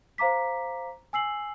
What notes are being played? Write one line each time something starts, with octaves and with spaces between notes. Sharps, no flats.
C5 F5 A#5 D6 B6
G#5 E6 C7 F#7